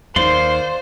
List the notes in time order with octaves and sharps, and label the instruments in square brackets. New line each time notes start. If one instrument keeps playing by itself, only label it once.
[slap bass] D#2 [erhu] C5 [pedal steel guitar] D5 F5 C6